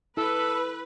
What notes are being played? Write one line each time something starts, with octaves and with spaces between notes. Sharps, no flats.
E4 A4 B4